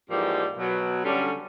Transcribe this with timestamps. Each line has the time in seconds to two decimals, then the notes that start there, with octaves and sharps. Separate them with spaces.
0.10 G#2 E3 F3 G3 A#3 G4
0.58 B2 F#3
1.05 D3 G3 C#4